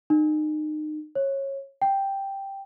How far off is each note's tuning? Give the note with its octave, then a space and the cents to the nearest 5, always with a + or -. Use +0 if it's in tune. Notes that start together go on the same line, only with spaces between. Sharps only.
D#4 -30
C#5 -20
G5 +0